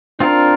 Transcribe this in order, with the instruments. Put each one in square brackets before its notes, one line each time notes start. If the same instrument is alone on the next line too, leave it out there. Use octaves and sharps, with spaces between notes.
[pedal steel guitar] C4 F4 A#4 [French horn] D4